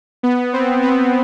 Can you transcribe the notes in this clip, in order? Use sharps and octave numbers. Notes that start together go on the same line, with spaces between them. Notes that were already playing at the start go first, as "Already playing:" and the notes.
B3
C4
B3